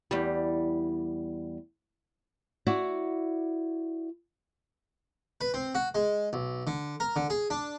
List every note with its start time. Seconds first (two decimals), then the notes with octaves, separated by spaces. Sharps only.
0.11 E2 G3
2.67 E4 F#4 D5
5.41 B4
5.54 C4
5.75 F#4
5.95 G#3
6.33 B1
6.67 D3
7.00 A#4
7.16 D3
7.30 G#4
7.50 D4